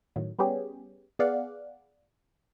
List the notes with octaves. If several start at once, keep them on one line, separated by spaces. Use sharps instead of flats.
A2 D#3 F#3
G3 B3 C#4 G4 G#4
B3 G#4 D5 F5 F#5